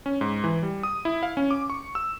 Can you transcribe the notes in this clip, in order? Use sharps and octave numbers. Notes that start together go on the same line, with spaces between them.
C#4
G#2
E3
G3
D#6
E4
F5
C#4
D6
C#6
E6